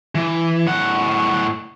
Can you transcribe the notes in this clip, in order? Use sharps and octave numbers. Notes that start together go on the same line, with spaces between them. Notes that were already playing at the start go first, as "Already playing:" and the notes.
E3
A2 F#5